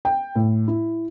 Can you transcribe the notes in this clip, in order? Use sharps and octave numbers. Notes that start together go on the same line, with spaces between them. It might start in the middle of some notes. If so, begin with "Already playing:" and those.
G5
A2
E4